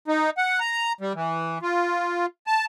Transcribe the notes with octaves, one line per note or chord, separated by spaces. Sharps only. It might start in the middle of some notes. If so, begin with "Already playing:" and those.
D#4
F#5
A#5
G3
E3
F4
A5